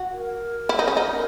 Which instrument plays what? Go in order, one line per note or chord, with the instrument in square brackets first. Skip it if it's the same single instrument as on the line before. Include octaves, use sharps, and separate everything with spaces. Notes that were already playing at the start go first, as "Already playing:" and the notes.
Already playing: [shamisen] F#4
[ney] A#4
[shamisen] E4
D#4
C#4
D#4
[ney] A#4